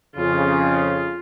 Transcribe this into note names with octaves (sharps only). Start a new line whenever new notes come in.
F2 C#3 F4